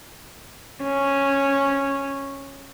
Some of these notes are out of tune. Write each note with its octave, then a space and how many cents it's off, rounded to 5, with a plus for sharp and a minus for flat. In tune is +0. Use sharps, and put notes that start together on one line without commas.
C#4 -5